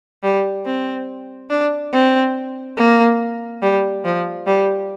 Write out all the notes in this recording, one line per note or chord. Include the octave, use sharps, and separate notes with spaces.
G3
C4
D4
C4
A#3
G3
F3
G3